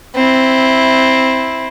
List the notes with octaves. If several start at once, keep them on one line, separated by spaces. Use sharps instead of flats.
C4 E4